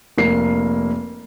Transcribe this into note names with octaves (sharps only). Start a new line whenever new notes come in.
F1 A#3 C7